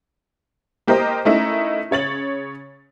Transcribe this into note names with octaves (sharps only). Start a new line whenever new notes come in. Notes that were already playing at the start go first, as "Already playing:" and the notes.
A#3 G4 A#4 C5 D#5
A3 C#4 D#4 E4 A#4 E5
C#3 C#5 A6 F#7